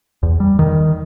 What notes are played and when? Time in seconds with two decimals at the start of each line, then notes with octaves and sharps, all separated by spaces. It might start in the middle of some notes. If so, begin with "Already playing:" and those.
0.23 E2
0.40 G3
0.59 D#3